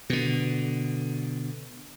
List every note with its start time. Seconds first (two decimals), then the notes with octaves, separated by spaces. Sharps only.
0.10 B2 D3